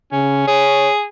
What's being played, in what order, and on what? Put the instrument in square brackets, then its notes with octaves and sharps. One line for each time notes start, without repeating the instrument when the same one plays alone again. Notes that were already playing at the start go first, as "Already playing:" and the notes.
[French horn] C#3 [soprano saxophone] C#4
[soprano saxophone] G#4 [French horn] C#5